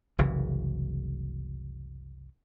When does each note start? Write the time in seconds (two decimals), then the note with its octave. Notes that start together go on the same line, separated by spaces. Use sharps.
0.18 F#1 C2 C#3 E3